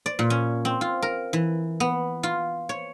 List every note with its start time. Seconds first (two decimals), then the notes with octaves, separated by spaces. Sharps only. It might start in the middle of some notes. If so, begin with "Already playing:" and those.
0.06 D5
0.19 A#2
0.30 C#4
0.65 C4
0.81 F4
1.02 A#4
1.33 E3
1.80 B3
2.23 F4
2.69 C#5